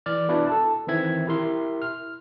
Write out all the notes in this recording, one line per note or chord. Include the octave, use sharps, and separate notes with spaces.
E3 D5 F6
B3 D4 E4 F#4 B4 D5
A4 A5
D#3 E3 C4 E5 G#6
E4 G4 A#4 E5 C6
F6